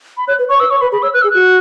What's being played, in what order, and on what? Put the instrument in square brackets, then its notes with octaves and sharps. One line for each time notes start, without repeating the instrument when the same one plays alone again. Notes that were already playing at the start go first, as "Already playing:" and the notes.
[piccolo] B5
[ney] C#5 [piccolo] F#6
[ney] B4
[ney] C#5 [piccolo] C#6
[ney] B4 [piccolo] E6
[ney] C#5 [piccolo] C#6
[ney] B4 [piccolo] B5
[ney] G#4 [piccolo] B5
[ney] C#5 [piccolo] E6
[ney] B4 [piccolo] F#6
[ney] G#4 [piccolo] E6
[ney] F#4 [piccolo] F#6